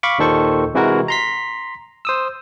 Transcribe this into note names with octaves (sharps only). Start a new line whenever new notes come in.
F5 B5 C#6 D6
D#2 A#2 D#3 A4 C5 C#6
C3 E3 G#3 E4 F#4 A#4
A#5 C6 B6
C5 D#6 E6